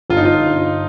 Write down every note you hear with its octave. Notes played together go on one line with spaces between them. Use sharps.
G1 F4
D#4
G1 F4
G1